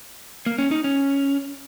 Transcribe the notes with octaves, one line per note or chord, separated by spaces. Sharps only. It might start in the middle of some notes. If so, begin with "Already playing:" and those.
A#3
C#4
D#4
C#4